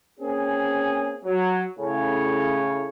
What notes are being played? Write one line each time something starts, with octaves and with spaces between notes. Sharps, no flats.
A#3 C4 C#4 G#4
F#3
A2 C#3 C#5